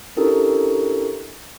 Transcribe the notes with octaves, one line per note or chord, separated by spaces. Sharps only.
C#4 D4 E4 G4 A4 A#4